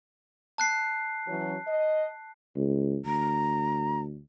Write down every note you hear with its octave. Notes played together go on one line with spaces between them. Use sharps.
A5 F#6 C7
E3 F#3 C#4
D#5
C#2
D2 A#5